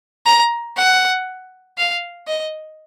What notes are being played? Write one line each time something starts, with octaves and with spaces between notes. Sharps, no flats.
A#5
F#5
F5
D#5